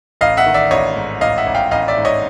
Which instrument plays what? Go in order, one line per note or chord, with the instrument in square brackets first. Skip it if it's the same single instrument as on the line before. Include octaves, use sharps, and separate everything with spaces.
[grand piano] A1 D#5 F5
E5 F#5
D#3
D5 E5
A1 C#5 D#5
G#2
A1 D#5 F5
E5 F#5
A1
F5 G5
A1 D#5 F5
D5 E5
G#2
C#5 D#5